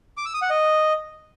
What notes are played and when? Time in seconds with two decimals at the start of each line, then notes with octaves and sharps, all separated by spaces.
0.17 D6
0.26 E6
0.34 D#6
0.42 F#5
0.50 D#5